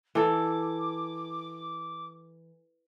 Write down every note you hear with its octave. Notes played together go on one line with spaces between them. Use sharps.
E3 A4 D6